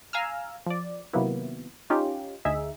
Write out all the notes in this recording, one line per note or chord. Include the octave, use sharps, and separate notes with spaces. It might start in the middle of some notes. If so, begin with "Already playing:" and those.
F5 G#5 A#5 E6 F6
F3 D5
C3 D#3 F#3 A#3 B3 E4
C#4 D#4 F4 G4
D2 D#4 G#4 E5